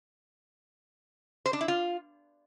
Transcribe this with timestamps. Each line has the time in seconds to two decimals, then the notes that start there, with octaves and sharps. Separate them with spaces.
1.46 C5
1.53 D4
1.61 E4
1.68 F4